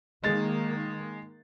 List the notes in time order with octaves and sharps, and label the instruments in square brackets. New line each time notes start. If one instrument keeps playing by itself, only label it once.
[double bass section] D#3 A#3 [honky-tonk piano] G#3 A6